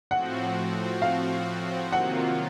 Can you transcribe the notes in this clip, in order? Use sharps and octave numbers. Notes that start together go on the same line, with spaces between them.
A2 F3 C4 F#4 F#5
F5
C3 D#3 F#3 A#3 F4 F#5